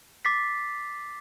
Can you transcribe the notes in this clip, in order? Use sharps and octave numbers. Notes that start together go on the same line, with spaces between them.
D6 A6 B6 C7